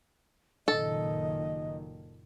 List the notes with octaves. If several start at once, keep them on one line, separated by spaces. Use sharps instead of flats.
F#1 A#2 D#3 A4 D#5